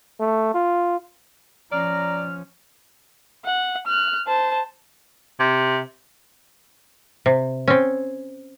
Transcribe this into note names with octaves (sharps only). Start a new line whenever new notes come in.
A3
F4
F3 C#4 D5 A#5 F6
F#5
F6 F#6
C5 A5
C3
C3
C4 C#4